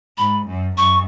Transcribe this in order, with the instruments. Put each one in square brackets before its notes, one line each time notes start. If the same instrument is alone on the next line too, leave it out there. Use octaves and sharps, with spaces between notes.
[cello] G#2 [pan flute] B5
[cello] F#2
[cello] F#2 [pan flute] C#6